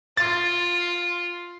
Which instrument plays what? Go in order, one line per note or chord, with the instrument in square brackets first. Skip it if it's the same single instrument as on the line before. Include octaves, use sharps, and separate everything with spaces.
[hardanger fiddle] F4 [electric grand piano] A6